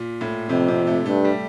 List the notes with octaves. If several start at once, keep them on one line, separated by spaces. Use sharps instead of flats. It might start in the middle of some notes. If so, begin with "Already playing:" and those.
Already playing: A#2
A2
F2 C3
C3
A3
G2 A3
G3